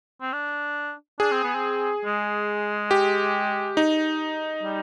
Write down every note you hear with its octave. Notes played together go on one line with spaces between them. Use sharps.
C4
D4
D4 G#4
C4
B3
C4
G#3
G4
D#4
G3